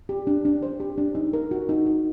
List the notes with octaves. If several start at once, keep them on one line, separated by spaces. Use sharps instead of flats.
G4
D4
D4
C5
G4
D4
D#4
A#4
F#4
D#4
D#4